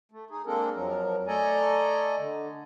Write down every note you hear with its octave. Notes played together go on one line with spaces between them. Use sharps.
A3
D#4 G#4
G#3 A#3 C4 D4 A4 A#4
F2 F3 F#3 A#4
A3 A4 D5 D#5 G#5 A#5
D3